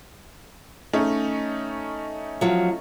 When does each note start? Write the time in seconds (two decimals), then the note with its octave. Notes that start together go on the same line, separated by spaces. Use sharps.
0.93 A3 C#4 D#4
2.41 F3 F#3